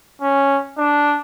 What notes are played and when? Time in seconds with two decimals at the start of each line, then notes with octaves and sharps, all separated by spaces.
0.22 C#4
0.78 D4